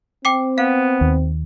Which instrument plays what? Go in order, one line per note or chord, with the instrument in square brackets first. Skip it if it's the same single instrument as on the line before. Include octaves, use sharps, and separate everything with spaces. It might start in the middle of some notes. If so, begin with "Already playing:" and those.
[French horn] C4 [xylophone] G5 D6 C7
[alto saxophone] B3 [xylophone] F5
[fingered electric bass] D#2